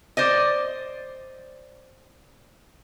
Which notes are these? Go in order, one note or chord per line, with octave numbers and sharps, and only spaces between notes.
C5 D5 D#5